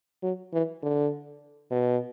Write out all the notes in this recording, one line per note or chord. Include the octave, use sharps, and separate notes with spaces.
F#3
E3
D3
B2